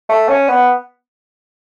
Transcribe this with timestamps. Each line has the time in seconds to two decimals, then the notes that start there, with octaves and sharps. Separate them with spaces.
0.09 A3
0.28 C#4
0.48 B3